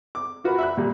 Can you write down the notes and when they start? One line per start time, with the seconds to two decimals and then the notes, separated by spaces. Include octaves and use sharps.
0.15 D6
0.44 F4 F#4 A#4 B4
0.58 E5 B5 F#6
0.77 A#2 G3 A#3